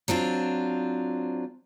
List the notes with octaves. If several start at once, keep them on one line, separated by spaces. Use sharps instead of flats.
F#3 C4 D4 F4